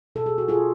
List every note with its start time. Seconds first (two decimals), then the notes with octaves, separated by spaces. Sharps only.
0.15 B2 A4
0.26 G#4
0.38 F#4
0.48 F4 G#4